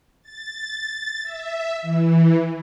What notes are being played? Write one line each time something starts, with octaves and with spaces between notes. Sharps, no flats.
A6
E5
E3